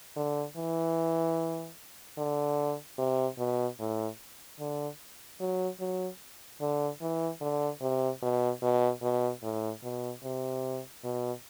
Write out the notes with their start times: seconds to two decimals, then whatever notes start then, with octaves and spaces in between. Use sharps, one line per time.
0.16 D3
0.57 E3
2.18 D3
2.98 C3
3.39 B2
3.80 A2
4.60 D3
5.40 F#3
5.80 F#3
6.61 D3
7.01 E3
7.41 D3
7.81 C3
8.22 B2
8.62 B2
9.03 B2
9.43 A2
9.84 B2
10.24 C3
11.04 B2